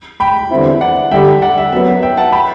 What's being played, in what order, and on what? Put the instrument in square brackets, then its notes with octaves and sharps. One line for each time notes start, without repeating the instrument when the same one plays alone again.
[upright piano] G5 B5
[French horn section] E2 D3 G3 C4 E4
[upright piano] D5 F#5
[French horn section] D3 G3 D4 [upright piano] E5 G5
[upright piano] D5 F#5
E5
[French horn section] F#2 F#3 B3 [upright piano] E5
[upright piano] E5 G5
F#5 A5
G5 B5